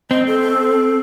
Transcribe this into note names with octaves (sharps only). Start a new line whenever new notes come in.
C4 D#5
A4